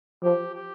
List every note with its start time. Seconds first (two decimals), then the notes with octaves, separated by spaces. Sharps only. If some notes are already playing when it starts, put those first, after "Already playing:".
0.23 F3 G4
0.55 G4